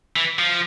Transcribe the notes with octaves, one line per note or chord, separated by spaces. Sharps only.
E3
F3